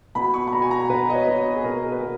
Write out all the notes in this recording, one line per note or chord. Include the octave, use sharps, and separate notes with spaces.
B2 B5
C#6
B5
B2 A#5
G#5
A#5
B2 B4
D#5
C#5
B2 B4
G#4
B2 A#4
A#4
B4
B2 A#4